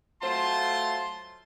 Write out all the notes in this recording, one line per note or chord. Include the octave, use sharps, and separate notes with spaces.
F#3 A3 F4 C5 A5 C6